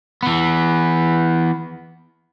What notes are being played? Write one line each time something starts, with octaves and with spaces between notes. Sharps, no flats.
E3 B3